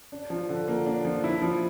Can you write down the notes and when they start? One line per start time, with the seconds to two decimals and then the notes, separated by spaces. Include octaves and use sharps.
0.12 D4
0.30 F3
0.49 D3
0.68 A#3
0.86 D4
1.05 F3
1.24 E4
1.42 F3